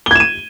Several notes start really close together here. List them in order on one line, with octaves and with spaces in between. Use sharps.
G7 G#6 E7 D#7